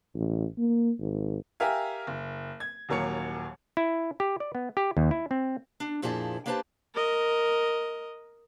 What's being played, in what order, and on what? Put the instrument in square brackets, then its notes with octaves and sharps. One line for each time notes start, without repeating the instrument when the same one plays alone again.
[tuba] A1
A#3
G#1
[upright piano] G4 A#4 E5 F5 G#5
F#1
G#6
D#1 D#2 F#3 A#3 C#5 C#7
[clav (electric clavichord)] E4
G4
D5
B3
G4
D#2
E4
C4
[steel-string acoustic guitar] D4
F2 A#2 F3 E4 G#4 A5
A#3 D4 G4 B4 C5 A5
[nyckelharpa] A#4 D#5